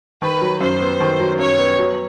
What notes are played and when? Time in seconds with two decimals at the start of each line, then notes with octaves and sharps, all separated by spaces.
0.22 D#3 B4
0.42 F#3
0.61 F#2 C5
0.81 B3
1.00 D#3
1.20 F#3
1.39 F#2 C#5
1.58 B3
1.79 F#3